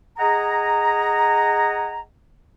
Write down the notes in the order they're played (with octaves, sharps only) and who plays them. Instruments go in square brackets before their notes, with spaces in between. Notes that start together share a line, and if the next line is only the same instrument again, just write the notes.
[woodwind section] G#4 D#5 F#5 G#5 A#5